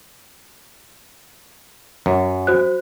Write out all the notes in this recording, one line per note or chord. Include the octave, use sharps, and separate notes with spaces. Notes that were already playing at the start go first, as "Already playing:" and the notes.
F#2
F#4 C5 F#6